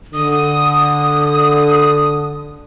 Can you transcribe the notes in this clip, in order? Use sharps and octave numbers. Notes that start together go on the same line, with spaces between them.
D3 D#6